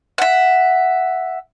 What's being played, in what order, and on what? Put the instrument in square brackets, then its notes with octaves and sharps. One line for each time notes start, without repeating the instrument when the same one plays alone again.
[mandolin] E5 F#5